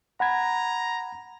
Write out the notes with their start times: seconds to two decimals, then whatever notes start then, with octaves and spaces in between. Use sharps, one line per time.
0.20 F#5 A#5 B5 G#6